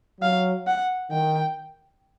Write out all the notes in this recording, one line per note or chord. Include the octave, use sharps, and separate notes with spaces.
F#3 F5
F#5
D#3 G5